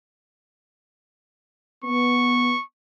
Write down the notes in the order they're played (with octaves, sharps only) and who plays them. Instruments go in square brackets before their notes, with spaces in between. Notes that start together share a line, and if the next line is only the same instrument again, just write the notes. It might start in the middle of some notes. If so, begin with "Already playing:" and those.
[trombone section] B3 [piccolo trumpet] C#6